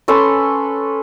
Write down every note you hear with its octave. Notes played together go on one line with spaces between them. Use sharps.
C#4 A4 B4 C6